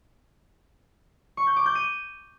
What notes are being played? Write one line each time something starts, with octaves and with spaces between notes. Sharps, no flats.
C#6
G6
D6
G6
D#7